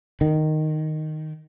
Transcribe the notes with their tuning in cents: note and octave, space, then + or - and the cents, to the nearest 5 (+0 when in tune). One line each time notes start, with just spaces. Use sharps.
D#3 -5